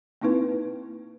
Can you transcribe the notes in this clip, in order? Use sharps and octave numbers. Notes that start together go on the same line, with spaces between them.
A#3 C4 D#4 E4 B4